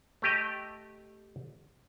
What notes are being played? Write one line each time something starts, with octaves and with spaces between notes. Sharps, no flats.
A3 G4 D#5